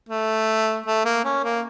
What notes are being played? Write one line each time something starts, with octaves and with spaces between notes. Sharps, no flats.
A3
A3
A#3
C#4
A#3